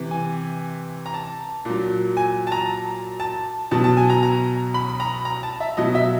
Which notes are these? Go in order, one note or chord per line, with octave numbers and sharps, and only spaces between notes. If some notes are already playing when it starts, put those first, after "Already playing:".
Already playing: C3 E3
G#5
A#5
A5
A#2 F#3
G#5
A5
A#5
A5
B2 F#3 A5
A5
G#5
A#5
A#5
B5
B5
A#5
A#5
A5
E5
B2 F#3 D#5
E5